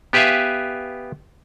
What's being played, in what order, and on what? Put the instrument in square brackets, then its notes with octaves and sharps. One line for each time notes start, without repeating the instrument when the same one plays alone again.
[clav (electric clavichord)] B3 G4 B4 E5 F5 G#5